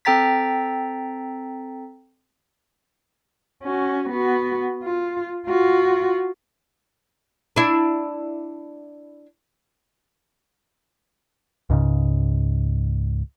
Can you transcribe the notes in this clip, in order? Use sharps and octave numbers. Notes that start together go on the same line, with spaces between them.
C4 A4 G5 A#5 A6 B6
C#4 F#4
B3 F#4
F4
F4 F#4
D4 E4
C#2 G#2 C#3